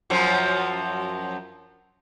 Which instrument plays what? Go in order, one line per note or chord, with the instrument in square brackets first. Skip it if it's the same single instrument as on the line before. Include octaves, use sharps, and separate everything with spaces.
[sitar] F#2 F3 F#3